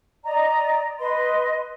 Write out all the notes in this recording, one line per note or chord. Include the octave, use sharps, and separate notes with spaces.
D5 D#5 A#5
B4 D#5 C6